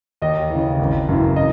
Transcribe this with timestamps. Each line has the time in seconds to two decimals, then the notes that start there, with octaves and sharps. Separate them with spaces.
0.22 D#2 D#5
0.50 E3
0.55 C#3
0.79 G#1
1.09 F#2 C#3 E3
1.36 D#5